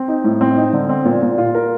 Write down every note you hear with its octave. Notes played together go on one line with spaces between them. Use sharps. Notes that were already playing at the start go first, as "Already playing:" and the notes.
Already playing: C4
D#4
A2
C4
D#4
D3
C4
A#2
A#2
F4
A#4